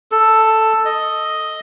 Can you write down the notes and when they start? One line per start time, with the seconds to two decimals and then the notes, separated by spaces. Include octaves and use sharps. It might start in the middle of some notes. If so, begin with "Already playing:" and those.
0.12 A4
0.85 D#5